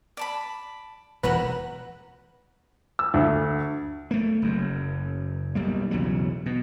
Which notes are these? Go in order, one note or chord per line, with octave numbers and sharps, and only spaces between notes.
D5 A5 B5
E1 E2 F#4 B4 F#5 A#5
E6
D2
A3 A#3
F#1 F#2
B1 G3 A#3
B1 E2 C#3 F#3
B2